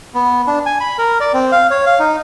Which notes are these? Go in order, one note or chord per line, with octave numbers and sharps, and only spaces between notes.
B3
D4
G#5
B5
A#4
D5
C4
F5
C#5
F5
D#4